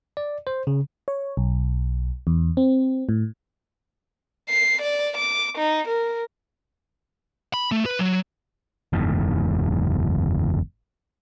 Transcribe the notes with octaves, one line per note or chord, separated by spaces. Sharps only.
D5
C5
C#3
C#5
B1
E2
C4
A2
C7
D5
D6
D#4
A#4
B5
A3
B4
F#3
F#1 E2 G#2